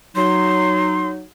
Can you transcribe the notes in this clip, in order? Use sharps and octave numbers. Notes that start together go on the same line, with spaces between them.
F#3 D#4 C6